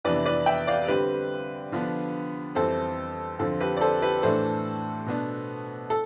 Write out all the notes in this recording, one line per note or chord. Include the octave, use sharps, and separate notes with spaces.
F2 C3 E3 B3 D4 B4 D5
B4 D5
E5 G5
D5 F5
D3 G3 C4 G4 B4
D3 F3 B3 D4
F2 E3 G3 C4 A4 C5
F2 D3 F3 C4 A4
G4 B4
D5
A4 C5
G4 B4
A2 E3 A3 D4 A4 C5
B2 B3 D4
A4